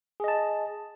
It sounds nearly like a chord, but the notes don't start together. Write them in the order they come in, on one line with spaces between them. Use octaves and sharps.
G#4 D#5 A5